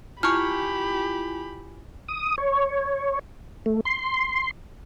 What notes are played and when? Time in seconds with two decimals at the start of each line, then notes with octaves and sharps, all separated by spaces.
0.23 E4 F4 G4 G#5 B5 C#6 F6
2.08 D#6
2.38 C#5
3.66 A3
3.85 C6